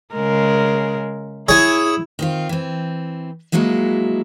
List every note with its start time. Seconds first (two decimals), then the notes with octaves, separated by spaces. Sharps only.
0.14 C#3 G#3 A#4
1.49 E4 G#4 C#5
2.19 D#3 C4 F4
2.49 E3 C4
3.52 F3 F#3 G#3 A#3 E4 F#4